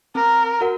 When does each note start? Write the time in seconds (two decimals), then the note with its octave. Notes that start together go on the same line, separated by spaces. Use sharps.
0.15 C4 A#4
0.61 F#4 A#4 F#5